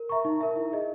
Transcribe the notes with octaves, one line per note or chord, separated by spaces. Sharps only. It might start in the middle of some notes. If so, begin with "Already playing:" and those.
Already playing: A#4
E5 A#5 C#6
D#4
A#4 E5
E4
G#4 D#5